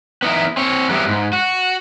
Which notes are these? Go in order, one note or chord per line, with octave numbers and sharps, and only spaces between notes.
B3 D#4 E4
C4 C#5
F#3 G3 B3 E4
G#2
F#4